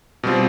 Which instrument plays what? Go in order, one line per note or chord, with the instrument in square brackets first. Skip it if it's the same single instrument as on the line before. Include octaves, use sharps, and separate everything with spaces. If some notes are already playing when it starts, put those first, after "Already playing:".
[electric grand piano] B2 G3 C4 F4